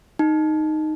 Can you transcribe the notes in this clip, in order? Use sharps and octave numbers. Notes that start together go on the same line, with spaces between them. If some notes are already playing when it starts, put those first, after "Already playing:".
D#4